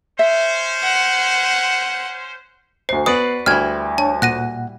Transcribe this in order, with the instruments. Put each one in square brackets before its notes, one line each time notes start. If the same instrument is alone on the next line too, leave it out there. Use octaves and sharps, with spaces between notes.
[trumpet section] C#4 C5 [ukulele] E5
[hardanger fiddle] F#5
[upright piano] D2 C7 [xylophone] C5
[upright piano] B3 [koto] F#4 B4 D5 [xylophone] D#6
[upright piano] D2 [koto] G3 E4 [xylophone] F6 G#6
[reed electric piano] D4 C#5 [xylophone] A5
[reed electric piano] A#2 F#5 [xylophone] F#6 A#6 D#7